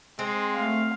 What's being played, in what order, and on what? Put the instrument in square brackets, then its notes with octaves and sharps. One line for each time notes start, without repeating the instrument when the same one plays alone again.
[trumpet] G#3 [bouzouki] C4
[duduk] A3 [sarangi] F5